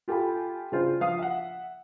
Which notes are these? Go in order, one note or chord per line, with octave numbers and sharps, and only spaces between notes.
F4 G4 A4 G5 G#5 B5
C#3 D4 F4 C5
F3 F5 D#6
E5 F#5